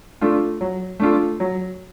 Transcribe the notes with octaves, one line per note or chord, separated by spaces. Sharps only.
A3 D4 F4 A4
F#3
A3 D4 F4 A4
F#3